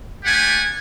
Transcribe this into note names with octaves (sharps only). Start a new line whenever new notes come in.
A3 D4 G4 F#5 G#5